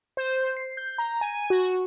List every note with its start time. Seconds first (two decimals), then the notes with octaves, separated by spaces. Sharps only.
0.17 C5
0.57 C7
0.77 G6
0.98 A#5
1.21 G#5
1.50 F#4